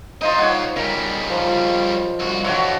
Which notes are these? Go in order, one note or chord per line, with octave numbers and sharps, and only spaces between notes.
D#4 F4 C5 D#5
C#5 F#5
C#3 G3 A#4
F3
C2 F#4
E3 D4 F#4 C#5 C#6